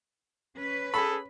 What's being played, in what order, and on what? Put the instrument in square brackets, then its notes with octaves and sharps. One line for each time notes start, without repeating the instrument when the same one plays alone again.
[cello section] C#4 B4
[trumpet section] G#4 A4 [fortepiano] B5